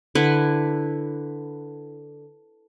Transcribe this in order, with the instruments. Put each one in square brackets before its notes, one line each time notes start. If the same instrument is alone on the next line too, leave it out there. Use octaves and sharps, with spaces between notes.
[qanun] D3 E4 B4